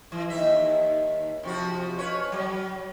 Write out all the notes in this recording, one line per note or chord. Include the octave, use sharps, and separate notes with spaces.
E3
D#2 D#4 E5
C3 F3 F#4
C#4 B4 C#5
F#3